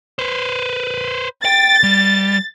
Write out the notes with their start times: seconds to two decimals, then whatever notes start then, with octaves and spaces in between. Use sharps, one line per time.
0.19 B4 C5
1.45 G5 A6
1.83 G3